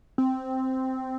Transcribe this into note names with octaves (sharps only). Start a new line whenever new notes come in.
C4